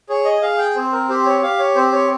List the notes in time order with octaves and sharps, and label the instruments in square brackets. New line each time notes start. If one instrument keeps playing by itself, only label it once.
[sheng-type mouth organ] G#4 C#5
D#5
G#4 F5
G5
C4 C5
A#4
G4 C5
C#5
G4 F5
C#5
C4 C5
C#5